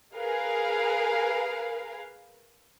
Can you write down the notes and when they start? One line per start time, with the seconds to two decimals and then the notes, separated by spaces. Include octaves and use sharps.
0.14 G#4 A#4 B4 F5